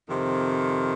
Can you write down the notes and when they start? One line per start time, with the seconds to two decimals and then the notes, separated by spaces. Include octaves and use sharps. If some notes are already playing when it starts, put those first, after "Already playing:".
0.09 F2 C3 D#3